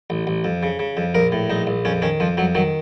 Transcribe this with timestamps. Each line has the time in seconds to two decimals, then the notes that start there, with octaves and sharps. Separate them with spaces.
0.10 A1
0.27 A1
0.44 F2
0.63 C#3
0.79 C#3
0.97 F2
1.15 A#1 A#4
1.32 A2
1.50 A#1 D#4
1.67 A#1
1.85 F2 C#4
2.02 D#3 C#4
2.20 F2 F3
2.37 F2 F#3
2.55 D#3 F#3